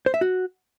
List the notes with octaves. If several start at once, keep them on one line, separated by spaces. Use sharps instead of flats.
C5
E5
F#4